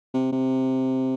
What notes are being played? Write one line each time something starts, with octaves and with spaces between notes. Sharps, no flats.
C3
C3